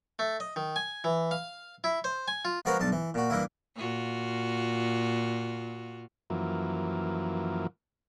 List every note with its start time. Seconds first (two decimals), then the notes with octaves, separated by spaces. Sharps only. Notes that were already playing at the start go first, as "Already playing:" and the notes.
0.19 A3
0.40 D#5
0.56 D#3
0.76 G#5
1.04 E3
1.31 F5
1.84 E4
2.04 C5
2.28 G#5
2.45 F4
2.65 F3 G#3 F#4 A#4 B4 C#5
2.80 B1 G2 A5
2.92 E3
3.14 A#2 F#4
3.30 G2 E3 A#3 E4
3.76 A#2 F4 F#4
6.30 F#2 E3 F3 A#3